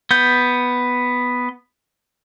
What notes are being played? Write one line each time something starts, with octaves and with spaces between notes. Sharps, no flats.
B3 G6